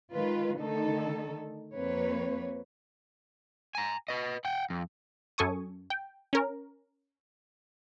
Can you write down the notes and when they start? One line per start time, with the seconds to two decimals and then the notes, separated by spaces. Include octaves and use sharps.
0.12 D#3 G#3 F4 B4
0.57 D3 D#3 A3 D#4 A4
1.75 F2 A#3 C4 B4 C#5
3.75 G#5 A#5
4.08 B4 D#5
4.45 F#5 G5
4.70 F2
5.38 F#2 A4 G#5 C#6 D#6
5.90 G5
6.33 C#4 A#4